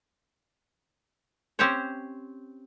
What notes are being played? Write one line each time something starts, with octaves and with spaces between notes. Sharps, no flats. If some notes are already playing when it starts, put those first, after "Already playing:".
C4 C#4 G4 C5 C#5